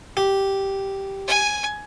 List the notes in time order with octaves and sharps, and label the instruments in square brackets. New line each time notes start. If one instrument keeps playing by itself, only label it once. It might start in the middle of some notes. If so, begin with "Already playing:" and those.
[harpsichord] G4
[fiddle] G#5